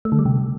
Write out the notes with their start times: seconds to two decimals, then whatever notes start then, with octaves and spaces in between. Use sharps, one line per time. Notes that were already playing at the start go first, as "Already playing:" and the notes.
0.05 A3
0.12 D3
0.19 G3
0.26 C3